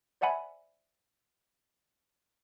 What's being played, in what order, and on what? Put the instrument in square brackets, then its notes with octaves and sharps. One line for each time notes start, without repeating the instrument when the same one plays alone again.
[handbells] C5 D5 E5 F#5 G#5 B5